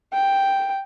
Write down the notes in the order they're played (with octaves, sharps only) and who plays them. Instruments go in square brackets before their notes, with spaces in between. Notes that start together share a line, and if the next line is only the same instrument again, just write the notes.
[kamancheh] G5